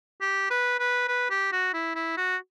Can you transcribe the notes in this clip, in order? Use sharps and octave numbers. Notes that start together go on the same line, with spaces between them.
G4
B4
B4
B4
G4
F#4
E4
E4
F#4